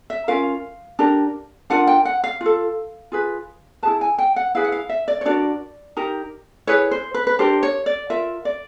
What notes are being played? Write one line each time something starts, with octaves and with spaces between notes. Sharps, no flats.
E5
C#4 F4 A#4 F5
D4 G4 A#4
D4 F4 A#4 F#5
G5
F#5
F5
F4 A4
F4 G#4 B4
E4 G#4 B4 A5
G#5
G5
F#5
E4 G#4 B4 F5
F#5
F5
E5
D5
C#5
D4 F#4 A#4 D5
D#4 G4 A#4
E4 G#4 B4 C#5
C5
B4
B4
D4 G4 A#4 C5
C#5
D5
F4 A#4 E5
D5